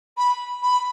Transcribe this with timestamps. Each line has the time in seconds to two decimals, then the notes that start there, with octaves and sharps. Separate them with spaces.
0.17 B5
0.62 B5